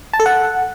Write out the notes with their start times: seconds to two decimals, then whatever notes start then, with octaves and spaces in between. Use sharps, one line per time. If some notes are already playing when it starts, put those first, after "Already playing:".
0.13 A5
0.20 A4
0.26 F#5